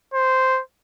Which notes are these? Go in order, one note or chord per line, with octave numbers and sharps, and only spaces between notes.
C5